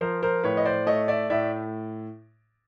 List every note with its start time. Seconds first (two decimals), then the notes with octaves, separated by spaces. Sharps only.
0.01 F3 A#4 C5
0.23 A#4 C5
0.44 A2 B4 C#5
0.57 D#5
0.65 C5 D5
0.86 A3 C#5 D#5
1.08 D5 E5
1.30 A2 D5 E5